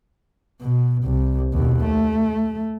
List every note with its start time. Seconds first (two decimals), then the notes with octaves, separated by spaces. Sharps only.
0.61 B2
1.04 C2
1.53 D#2 B2
1.85 A3